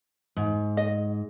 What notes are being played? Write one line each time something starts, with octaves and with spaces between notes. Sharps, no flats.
G#2
D#5